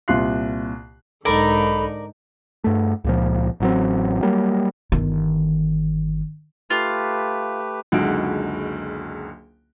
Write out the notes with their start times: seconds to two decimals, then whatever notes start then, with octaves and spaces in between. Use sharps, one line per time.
0.08 C2 A#2 F4 C6 F#6 C7
1.25 B1 G#2 D3 D#4 A4 A#4 D5 B5
2.64 G2 A3
3.04 C#2 A#2 F3
3.60 A1 F#3 C4
4.22 F#3 G3 A#3
4.92 G1 D#3
6.70 A3 F4 G4 B4
7.92 F#1 C#2 D3 D#4 F#4 D7